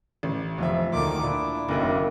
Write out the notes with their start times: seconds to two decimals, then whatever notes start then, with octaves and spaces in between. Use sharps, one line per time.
0.23 A1
0.58 F1 F3 E5
0.92 D2 A#2 D#3 D6
1.23 A#2 D4 E4
1.68 F#1 B1 D#3 A#3